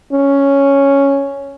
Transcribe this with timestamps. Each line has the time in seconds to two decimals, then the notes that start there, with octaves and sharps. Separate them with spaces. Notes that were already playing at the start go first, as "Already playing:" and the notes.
0.13 C#4